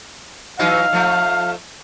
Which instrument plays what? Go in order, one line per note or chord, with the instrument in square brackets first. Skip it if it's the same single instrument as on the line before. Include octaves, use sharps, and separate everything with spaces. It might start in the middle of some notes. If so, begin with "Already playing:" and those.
[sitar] E3 F#3 D#4 [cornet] F5
[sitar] F3 A3